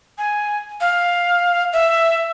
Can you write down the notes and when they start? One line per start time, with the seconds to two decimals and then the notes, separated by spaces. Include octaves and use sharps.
0.18 G#5
0.81 F5
1.73 E5